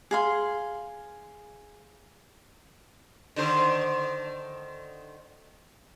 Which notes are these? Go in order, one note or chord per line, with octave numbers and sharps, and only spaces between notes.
G#4 F5 C6
D3 D#3 C5